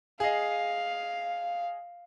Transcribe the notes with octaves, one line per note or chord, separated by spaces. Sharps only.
G#4 D#5 F5